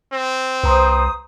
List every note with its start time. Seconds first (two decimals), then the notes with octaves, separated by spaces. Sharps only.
0.13 C4
0.63 C2 B4 C5 A#5 C6 D#6